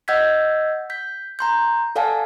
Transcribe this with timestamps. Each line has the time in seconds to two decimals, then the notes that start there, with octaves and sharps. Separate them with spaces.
0.08 D#5 F#5 E6 G6 G#6 B6
0.90 G6 B6
1.39 A#5 C6 G6
1.96 A4 D5 F5 F#5 G#5 A5